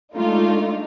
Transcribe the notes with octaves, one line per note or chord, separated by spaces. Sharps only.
G#3 A3 D4 D#4 F4